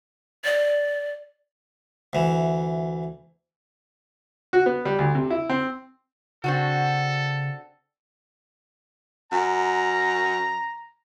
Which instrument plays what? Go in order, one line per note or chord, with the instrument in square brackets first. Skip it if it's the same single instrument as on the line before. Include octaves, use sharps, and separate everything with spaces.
[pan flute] D5
[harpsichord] D2 E3
[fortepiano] F#4
B3
G3
D2
C3
E4
C4
[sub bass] C#3 [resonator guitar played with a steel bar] C4 D4 F#4 [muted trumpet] A4
[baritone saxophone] F#2 [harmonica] A#5